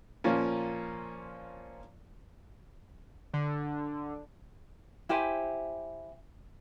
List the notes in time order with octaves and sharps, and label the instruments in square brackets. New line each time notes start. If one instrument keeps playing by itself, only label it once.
[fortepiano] A#2 F3 A#3 C#4
[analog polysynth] D3
[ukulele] E4 G4 C5 G#5